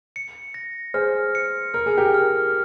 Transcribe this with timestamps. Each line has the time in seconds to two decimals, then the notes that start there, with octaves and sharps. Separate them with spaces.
0.16 C#7
0.54 A#6
0.94 G#4 C5 F6
1.35 C#7
1.74 A#4 F6
1.86 G#4
1.97 G4 A#4
2.14 F6